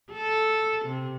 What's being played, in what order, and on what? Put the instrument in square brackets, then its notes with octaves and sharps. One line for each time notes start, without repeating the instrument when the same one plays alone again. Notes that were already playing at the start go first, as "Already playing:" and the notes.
[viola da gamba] A4
C3